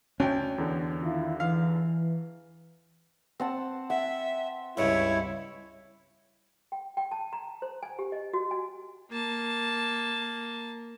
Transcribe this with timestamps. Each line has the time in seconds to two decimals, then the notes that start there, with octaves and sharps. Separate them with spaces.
0.20 D2 C#4 G5
0.58 E2 D3
1.03 D#3 E4 F4
1.40 E3 F5
3.40 C4 F#5 A5
3.90 E5 F#5
4.77 C#2 G2 C#3 E4 C#5
6.72 G5
6.97 G5
7.11 A5
7.33 A#5
7.62 C5
7.83 G#5
7.99 G4
8.12 D#5
8.33 F#4
8.51 G#5
9.11 A#3 A5